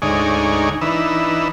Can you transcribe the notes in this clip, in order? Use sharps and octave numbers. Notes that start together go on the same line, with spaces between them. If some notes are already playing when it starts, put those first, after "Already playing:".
D2 G#2 D#4 C#5 D5 G#5
E3 D4 D#4 B4 E6